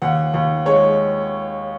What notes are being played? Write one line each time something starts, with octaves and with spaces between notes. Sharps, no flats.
D#2 F#5
D#2
G#3 C#5